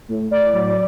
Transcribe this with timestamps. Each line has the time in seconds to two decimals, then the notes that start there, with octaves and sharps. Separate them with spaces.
0.08 A2
0.31 A2 D5
0.53 F#3